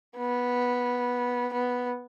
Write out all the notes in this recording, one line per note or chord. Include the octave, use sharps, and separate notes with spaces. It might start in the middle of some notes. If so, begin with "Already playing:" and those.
B3
B3